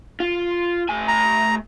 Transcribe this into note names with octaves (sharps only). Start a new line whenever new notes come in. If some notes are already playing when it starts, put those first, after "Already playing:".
F4
A3 G#5
A#5